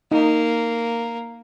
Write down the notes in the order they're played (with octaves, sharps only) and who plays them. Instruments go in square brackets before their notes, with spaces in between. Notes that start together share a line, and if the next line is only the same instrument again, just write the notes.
[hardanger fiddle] A#3 [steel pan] D#4